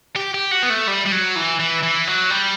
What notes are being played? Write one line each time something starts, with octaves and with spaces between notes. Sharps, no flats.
G4
G4
F#4
B3
A3
G3
G3
F#3
E3
E3
E3
F#3
G3